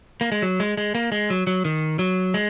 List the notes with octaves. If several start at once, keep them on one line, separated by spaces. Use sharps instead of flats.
A#3
G#3
F#3
G#3
G#3
A#3
G#3
F#3
F#3
D#3
F#3
G#3